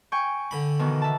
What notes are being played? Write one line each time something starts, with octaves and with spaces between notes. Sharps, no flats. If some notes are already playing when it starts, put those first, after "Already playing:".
G5 G#5 C#6
D3 B5
B2 D#3 E3
E5 A5